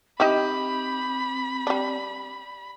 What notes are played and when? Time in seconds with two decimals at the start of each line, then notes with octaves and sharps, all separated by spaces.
0.20 C4 D#4 E4 G4 B5 D#6
1.67 G3 D4